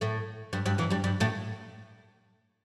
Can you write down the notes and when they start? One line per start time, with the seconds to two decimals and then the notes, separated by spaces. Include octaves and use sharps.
0.01 A2 A3
0.53 G2 G3
0.66 G2 G3
0.78 E2 E3
0.90 G2 G3
1.04 G2 G3
1.20 A2 A3